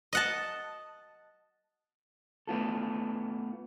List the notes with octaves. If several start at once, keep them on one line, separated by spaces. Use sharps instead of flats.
D#5 F#5 A5
A3 B3 F4 A4